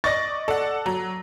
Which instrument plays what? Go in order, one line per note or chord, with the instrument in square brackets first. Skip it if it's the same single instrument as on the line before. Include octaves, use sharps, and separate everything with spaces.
[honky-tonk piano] D5 D#5 C#6 [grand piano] A6 A#6
[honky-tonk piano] A4 F#5 [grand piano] D5
[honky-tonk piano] F#3 [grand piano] A#5